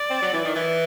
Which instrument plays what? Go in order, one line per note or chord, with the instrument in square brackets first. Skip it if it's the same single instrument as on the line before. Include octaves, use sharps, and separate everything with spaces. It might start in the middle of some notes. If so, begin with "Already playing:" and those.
Already playing: [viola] D5
[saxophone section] C4
F#3
E3
D#3
E3